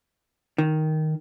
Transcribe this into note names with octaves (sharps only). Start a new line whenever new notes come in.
D#3